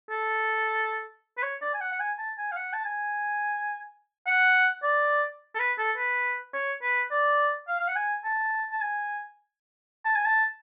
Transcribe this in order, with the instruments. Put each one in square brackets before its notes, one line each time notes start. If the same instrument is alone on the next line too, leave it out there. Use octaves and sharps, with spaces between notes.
[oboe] A4
B4
C#5
D5
G#5
F#5
F#5
G#5
A5
G#5
F5
F#5
A5
G#5
F#5
D5
A4
B4
A4
B4
C#5
B4
D5
F5
F5
F#5
G#5
A5
A5
G#5
A5
G#5
A5